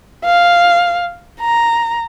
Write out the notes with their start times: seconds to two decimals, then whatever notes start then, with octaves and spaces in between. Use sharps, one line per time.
0.25 F5
1.40 A#5